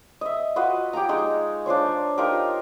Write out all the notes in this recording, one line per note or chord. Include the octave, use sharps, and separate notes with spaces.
D#5 E5
F4 F#4 B4 D#5
G4 G5 G#5 A#5
G#3 D#4 C#6
D4 F4 C5 C#5
D#4 F4 G4 A#4